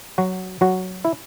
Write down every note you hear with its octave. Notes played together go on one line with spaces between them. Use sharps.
F#3 F#4
F#3 F#4
E4